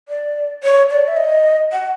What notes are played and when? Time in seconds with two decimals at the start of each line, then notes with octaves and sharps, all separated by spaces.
0.09 D5
0.64 C#5
0.90 D5
1.08 E5
1.17 D#5
1.72 F#5